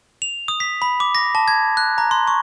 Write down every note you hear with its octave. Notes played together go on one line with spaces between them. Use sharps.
F7
D#6
B6
B5
D6
A#6
A5
G#6
F#6
A#5
C6
C#6